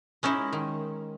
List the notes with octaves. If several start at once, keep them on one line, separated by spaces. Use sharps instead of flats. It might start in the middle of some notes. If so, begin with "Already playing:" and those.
G#3 C#4 D#4 E4
D#3